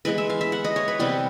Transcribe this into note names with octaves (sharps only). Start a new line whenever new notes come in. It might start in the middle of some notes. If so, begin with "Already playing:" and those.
E3 G#3 B3 B4
E5
F5
E5
F#5
D#5
C#5
B4
C3 E3 G3 B3 B4